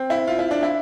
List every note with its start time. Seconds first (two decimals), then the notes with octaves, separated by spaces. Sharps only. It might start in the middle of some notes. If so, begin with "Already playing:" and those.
Already playing: C4
0.10 E4
0.27 F4
0.39 E4
0.51 D4
0.63 E4